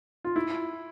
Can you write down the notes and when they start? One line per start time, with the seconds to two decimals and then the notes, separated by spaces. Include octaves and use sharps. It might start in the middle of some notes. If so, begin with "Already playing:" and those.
0.25 F4
0.36 E4